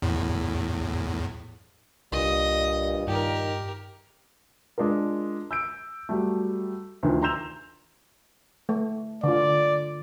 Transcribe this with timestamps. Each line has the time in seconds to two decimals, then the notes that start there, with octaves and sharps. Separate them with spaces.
0.02 E2 A2
2.12 C2 G2 A#2 D#5
3.08 G2 D#3 G4 A#4
4.78 G#3 D4 F4 A#4
5.51 E6 G6 D7
6.09 F#3 G3 A3
7.03 D2 D#3 F3
7.22 A#5 C6 E6 G6 E7 F7
8.69 A3
9.24 D3 F4 D5